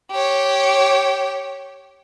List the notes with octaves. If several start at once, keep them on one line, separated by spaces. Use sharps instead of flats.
G4 C#5